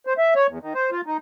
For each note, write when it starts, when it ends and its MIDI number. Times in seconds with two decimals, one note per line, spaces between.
0.06 0.14 72
0.18 0.34 76
0.35 0.47 73
0.48 0.59 40
0.62 0.73 51
0.75 0.90 72
0.91 1.01 65
1.06 1.17 63